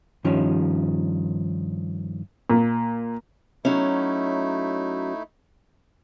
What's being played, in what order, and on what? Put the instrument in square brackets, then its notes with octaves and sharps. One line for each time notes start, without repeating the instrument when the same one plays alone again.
[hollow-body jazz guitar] G2 D#3 F3 C#4
[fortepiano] A#2
[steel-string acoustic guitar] F#3 C#4 [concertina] A3 D#4 E4